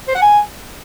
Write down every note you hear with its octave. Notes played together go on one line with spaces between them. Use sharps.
C5
F#5
G#5